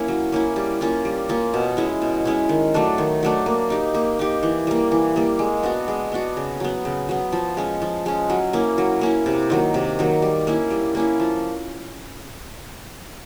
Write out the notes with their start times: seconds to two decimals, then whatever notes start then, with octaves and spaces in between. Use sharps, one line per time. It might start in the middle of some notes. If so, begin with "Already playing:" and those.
Already playing: A#3 C#4 E4
0.08 F#3
0.32 A#3 C#4 E4
0.56 G3
0.81 A#3 C#4 F4
1.05 G3
1.29 A#3 C#4 F4
1.54 B2
1.77 G#3 C#4 E4
2.02 B2
2.25 G#3 C#4 E4
2.49 D#3
2.74 F#3 A3 D4
2.98 D#3
3.23 F#3 A3 D4
3.46 A#3
3.70 D#4 G4
3.94 A#3
4.19 D#4 G4
4.43 E3
4.67 G3 A#3
4.92 E3
5.16 G3 A#3
5.39 G#3
5.63 B3 D4 F#4
5.88 G#3
6.12 B3 D4 F#4
6.37 C#3
6.60 F#3 B3
6.85 C#3
7.09 F#3 B3
7.32 F3
7.57 G#3 C#4
7.82 F3
8.06 G#3 C#4
8.30 F#3
8.53 A#3 C#4 E4
8.78 F#3
9.01 A#3 C#4 E4
9.26 C3
9.50 D#3 F#3 A#3
9.74 C3
9.99 D#3 F#3 A#3
10.22 G3
10.47 A#3 C#4 E4
10.70 G3
10.95 A#3 C#4 E4
11.20 F3